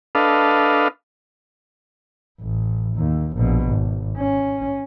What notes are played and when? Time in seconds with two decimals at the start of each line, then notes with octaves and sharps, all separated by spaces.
0.15 D4 A4 B4 D#5 F5
2.41 A1
2.96 D#2
3.37 A#1 B2
3.69 G#1
4.17 C#4